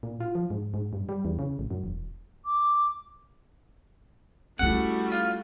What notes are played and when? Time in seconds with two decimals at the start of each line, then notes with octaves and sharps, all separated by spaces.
0.03 A#2
0.20 F4
0.35 F3
0.50 G#2
0.74 G#2
0.93 G2
1.09 G3
1.25 E2
1.39 C#3
1.59 A1
1.71 F#2
1.84 E1
2.45 D6
4.59 G3 A3 C#4 E4 F#4 F#5
5.12 F4